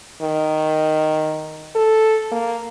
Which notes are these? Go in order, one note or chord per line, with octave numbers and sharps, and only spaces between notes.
D#3
A4
A#3